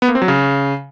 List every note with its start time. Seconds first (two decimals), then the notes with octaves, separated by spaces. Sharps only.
0.02 B3
0.09 A#3
0.15 C4
0.22 F#3
0.28 C#3